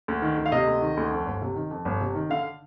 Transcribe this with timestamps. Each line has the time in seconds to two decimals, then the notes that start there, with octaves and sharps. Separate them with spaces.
0.08 D2
0.22 D#3
0.37 D2
0.46 F5
0.52 C3 D#5
0.67 D2
0.81 D#3
0.97 D2
1.11 F2
1.26 G1
1.42 C3
1.56 D#3
1.71 F2
1.85 G1
2.01 C3
2.15 D#3
2.30 D3 F5